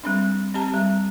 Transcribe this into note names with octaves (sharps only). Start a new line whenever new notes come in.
G3 C4 D4
C4 G4 A5 A#5
G3